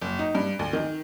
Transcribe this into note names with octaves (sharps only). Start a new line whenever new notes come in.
F#1
D#4
G2
D2
D#3